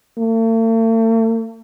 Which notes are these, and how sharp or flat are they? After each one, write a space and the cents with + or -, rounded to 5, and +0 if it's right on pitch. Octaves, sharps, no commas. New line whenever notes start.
A3 +45